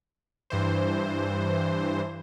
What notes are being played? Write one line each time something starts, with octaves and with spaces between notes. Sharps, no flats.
G2 E3 C5